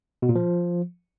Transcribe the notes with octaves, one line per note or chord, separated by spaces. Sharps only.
B2
A#2
F3